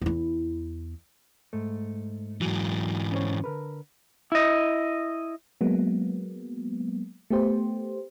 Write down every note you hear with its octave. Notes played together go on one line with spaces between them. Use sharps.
E2 E4
G#2 A3
G#2 E3 F#3
C#4 C5 C#5
D3 A#4 B4
E4 D#5
F#3 G#3 A#3 B3
A3 B3 G4 C5